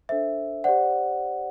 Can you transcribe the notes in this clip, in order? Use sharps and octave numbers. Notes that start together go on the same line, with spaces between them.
D4 A4 C5 E5
G4 C5 D5 F#5